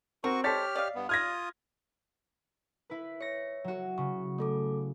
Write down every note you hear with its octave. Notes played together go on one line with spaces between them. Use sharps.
C4 F#4 A#4 C#6
G#3 G4 A4 C5 C#5 F6 A6 B6
D5 D#5 F5
G2 B3
F4 D#6 F6 G#6 A#6
E4 B4
C#5 A#6 C#7
F#3 F#4
C#3 C#6
A3 A4 D6